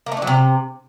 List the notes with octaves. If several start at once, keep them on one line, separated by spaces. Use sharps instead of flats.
A#3
A3
D4
F#3
C3